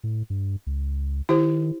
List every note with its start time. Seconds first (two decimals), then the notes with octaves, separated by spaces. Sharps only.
0.04 A2
0.30 G2
0.67 C#2
1.29 D#3 E4 G4 C5